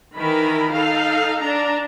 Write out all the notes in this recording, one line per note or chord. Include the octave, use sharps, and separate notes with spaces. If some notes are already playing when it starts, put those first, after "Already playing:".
D#3 E3 A#4 B5
D#4 A4 F5
D4 A#5